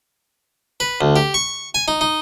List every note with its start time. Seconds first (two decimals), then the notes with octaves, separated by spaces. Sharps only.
0.80 B4
1.01 D2
1.16 G4
1.34 C#6
1.74 G#5
1.88 D#4
2.01 D#4